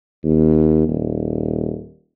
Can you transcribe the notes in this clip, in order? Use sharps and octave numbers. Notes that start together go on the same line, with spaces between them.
D#2
D#1